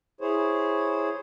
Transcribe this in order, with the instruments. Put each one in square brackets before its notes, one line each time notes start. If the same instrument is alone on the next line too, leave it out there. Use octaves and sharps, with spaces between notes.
[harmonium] E4 G#4 C5 C#5